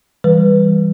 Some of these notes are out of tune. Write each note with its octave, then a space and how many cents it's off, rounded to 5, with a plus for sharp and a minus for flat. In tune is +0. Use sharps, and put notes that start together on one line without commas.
E3 +0 G3 +10 B4 -5